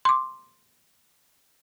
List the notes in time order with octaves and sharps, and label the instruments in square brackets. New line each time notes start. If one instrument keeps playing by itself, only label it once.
[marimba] C6 D6